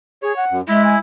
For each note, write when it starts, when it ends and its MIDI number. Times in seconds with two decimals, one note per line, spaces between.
0.22 0.35 68
0.22 0.45 73
0.36 0.57 78
0.51 0.61 42
0.68 0.95 56
0.68 0.99 64
0.68 0.82 76
0.84 0.97 80